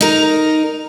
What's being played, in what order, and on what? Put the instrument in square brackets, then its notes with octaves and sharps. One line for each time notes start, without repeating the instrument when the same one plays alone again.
[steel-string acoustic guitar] D#4 A#4